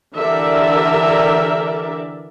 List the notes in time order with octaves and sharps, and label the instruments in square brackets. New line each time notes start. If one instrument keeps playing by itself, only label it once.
[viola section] D3 E3 G4 A#4 D5 E5